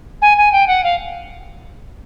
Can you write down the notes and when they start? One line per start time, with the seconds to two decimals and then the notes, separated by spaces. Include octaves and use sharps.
0.22 G#5
0.37 G#5
0.52 G5
0.68 F#5
0.84 F5